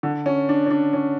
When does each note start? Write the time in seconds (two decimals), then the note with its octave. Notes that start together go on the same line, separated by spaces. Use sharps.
0.03 D3
0.26 C#4
0.49 D4
0.66 C#4
0.70 D4
0.93 C#4